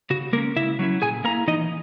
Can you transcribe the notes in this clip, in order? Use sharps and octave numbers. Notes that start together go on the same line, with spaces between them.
C#3 F#4
G#3 A#3 A#4
C#4
C#3 E4 E5
F#3 C#4 E4
A#2 G#4 G#5
A#3 E4 A#4 A#5
E3 D#4 D#5